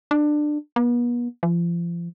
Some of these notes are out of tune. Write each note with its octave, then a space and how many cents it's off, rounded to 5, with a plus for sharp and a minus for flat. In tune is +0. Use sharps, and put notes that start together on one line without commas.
D4 +20
B3 -40
F3 -35